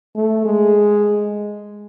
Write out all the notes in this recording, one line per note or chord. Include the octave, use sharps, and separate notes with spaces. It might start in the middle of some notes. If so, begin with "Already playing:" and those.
A3
G#3